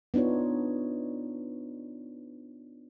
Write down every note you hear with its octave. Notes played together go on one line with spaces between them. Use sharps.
B3 D4 D#4 F4 C#5